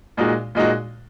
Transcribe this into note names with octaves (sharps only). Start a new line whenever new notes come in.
A#2 G#3 D#4 F#4
A#2 G#3 D#4 F#4